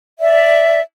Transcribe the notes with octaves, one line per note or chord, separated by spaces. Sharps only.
D5 E5